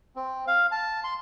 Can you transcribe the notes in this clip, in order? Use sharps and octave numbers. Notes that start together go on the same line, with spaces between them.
C4
F5
A5
C6